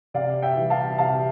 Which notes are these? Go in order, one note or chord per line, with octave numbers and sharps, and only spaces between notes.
C3 D5 F5
E5 G5
E3 G3
F5 A5
C3 F5 A5